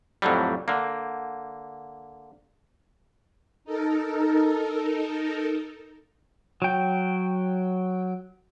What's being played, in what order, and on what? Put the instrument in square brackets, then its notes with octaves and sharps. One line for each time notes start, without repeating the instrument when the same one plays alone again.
[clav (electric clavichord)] F2 A2 D3 F#3 G3
D3 A#3
[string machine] D#4 A4 A#4
[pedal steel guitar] F#3 G5